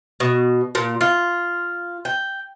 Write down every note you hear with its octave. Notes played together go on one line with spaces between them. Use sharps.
B2
A#2
F4
G5